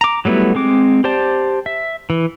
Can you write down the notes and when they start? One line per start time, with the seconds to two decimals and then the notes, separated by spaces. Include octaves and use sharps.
0.01 A#5 D6
0.25 F#3 G3 A3 B3 E4
0.55 G#3 C4 D6
1.04 G4 C5 D5 A5
1.66 E5
2.10 E3